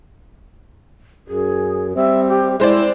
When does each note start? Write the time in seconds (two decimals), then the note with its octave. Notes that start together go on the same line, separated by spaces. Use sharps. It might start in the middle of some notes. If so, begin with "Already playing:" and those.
1.28 F#2 G#4
1.95 G3 C4 E5
2.28 G4
2.60 G#3 E4 C5 D5